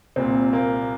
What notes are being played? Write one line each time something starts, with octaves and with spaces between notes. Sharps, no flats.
C2 A#2 C4
A#3